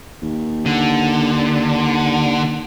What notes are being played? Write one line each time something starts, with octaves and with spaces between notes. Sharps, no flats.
D#2
D3